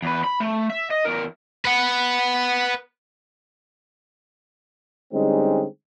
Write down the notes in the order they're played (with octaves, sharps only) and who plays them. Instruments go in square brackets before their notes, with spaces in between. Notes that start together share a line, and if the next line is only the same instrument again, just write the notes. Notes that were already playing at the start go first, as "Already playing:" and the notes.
[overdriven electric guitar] E2 B4
B5
A3
E5
D#5
E2 A#4
[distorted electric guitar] B4 F#5
[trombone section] D3 G3 G#3 C4 C#4 D#4